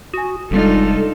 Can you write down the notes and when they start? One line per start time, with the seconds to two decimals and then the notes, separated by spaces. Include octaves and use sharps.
0.14 F#4 G#5 D#6
0.51 F1 C3 G3 G#3 D4 D#4 F4 A4